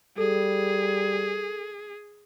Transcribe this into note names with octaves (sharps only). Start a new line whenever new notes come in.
G3 G#4 A4